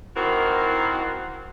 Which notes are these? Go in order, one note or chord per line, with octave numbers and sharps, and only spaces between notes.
D#3 E3 A#3 C4 F#4 A#4